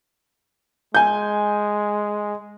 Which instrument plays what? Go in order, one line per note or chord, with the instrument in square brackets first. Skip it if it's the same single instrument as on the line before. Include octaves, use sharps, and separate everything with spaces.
[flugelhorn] G#3 [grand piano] G#5 G6